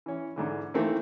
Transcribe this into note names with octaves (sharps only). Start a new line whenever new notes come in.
E3 C#4
G#2 D3 E3
D#3 E3 A3 A#3 C4 E4